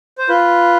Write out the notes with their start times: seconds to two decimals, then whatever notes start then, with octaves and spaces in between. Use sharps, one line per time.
0.18 C5
0.29 F4 B4